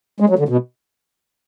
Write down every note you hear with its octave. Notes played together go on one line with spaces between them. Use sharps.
G#3
F#3
D3
B2